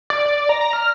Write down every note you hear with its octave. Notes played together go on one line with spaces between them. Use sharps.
D5
D5
D5
A#5
A#5
F6